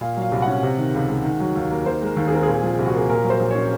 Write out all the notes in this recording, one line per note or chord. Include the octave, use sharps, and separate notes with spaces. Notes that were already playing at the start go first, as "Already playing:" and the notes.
A#2 F5
F#3 F5
C2
F#5
C#4
C3
D#3
C#2
G#3
D#3
F#3
D#2
A#3
D#3 C5
G#3 A#4
D#2
G#4
C4 A#4
A#2 G#4
F3
C2
F#4
A#3 G#4
A#2 A#4
F#3
C5
A#1
C#4 C#5